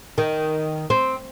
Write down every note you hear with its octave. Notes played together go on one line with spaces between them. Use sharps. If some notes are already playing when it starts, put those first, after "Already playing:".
D#3
C4